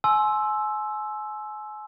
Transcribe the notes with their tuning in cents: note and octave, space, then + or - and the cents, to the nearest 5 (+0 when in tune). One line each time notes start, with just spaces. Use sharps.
G#5 +35 C6 +10 E6 +0